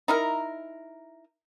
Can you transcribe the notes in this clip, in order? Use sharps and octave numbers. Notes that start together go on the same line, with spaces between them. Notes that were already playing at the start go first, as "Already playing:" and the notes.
D#4 E4 A#4